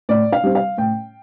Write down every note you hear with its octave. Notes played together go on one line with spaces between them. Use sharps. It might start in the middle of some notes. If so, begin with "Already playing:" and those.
A2 D5
F5
G3 C4
F5
A2 G5